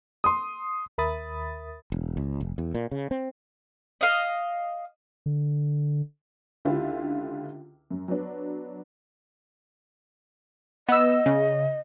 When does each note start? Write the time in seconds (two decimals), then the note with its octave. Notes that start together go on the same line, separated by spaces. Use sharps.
0.24 C6 D#6
0.98 D#2 A#4 E5 B5 D#6 A6
1.92 E1
2.17 C#2
2.41 F1
2.58 E2
2.74 A#2
2.91 C#3
3.11 C4
4.01 D#5 F5
5.26 D3
6.65 C#2 D3 E4 F4 G4 E5
7.90 F#2
8.08 F#3 B3 D4
10.89 B3 D#5 E6
11.26 C#3